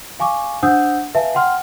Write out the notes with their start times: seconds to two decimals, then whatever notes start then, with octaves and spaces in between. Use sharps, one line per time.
0.20 F5 G#5 C#6 D6
0.63 D4 C5 F#5 D#6 E6 G6
1.14 B4 E5 F5 G#5 A5
1.35 F#5 G5 C6 F6